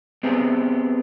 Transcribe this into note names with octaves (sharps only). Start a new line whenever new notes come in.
B3 C4 G4 G#4